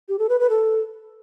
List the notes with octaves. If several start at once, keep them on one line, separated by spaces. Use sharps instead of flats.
G4
A4
B4
B4
A4